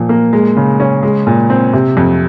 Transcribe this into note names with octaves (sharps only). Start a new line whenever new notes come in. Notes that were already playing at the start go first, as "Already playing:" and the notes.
Already playing: A#2 F3
A#3
G#3
C#3
C#4
G#3
A#2
C4
C3
F2